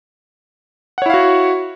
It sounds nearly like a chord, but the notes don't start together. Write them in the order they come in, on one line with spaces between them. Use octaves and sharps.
F#5 C#5 E4 F5 F#4